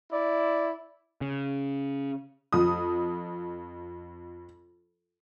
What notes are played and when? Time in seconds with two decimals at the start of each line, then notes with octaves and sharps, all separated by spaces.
0.12 E4 D5
1.21 C#3
2.52 F2 D#6